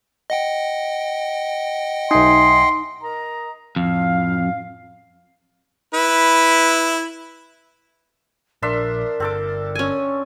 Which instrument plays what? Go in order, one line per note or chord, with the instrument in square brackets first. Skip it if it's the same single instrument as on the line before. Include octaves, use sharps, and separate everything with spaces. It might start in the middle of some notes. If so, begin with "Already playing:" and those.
[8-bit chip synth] D#5 F#5 G5
[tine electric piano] B1 E5 G#5 [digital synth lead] D#4 [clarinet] C6
[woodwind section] A#4 D#5 A#5
[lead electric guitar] F2 [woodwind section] A2 F5
[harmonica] E4 B4
[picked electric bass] A#1 [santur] D4 E5 C6 [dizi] A#4
[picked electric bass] G1 [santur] C4 A4 D6
[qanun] C#4 G#5